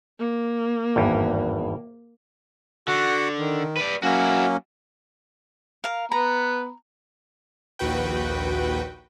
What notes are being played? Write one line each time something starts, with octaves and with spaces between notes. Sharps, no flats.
A#3
G#1 E2 G2
D3 F#4 F#5
D#3
B4 D5
F#3 A#3 C#4 E4 F#4
A#4 F5
B3 A#5 B5
A#1 D#2 F#4 B4 G5